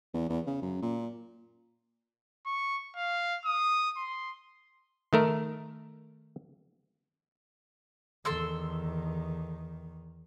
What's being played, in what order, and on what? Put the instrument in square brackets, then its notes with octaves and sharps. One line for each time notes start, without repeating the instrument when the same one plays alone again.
[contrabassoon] E2
E2
C#3
F#2
A#2
[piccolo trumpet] C#6
F5
D#6
C6
[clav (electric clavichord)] D#3 A3 A#4
[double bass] E2 D#3 [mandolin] A4 C6 E6